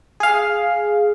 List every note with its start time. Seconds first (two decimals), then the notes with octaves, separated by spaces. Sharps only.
0.20 G#4 F5